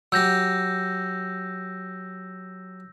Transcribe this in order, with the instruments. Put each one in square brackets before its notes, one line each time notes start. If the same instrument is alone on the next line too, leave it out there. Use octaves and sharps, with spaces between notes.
[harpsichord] F#3 G4 [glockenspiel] E6 G6 A#6